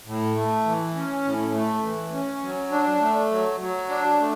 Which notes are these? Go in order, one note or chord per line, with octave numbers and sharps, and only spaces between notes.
A2
A3
E3
C#4
A2
A3
E3
C#4
F#3
D4
A3
F#3
F#3
D4
A3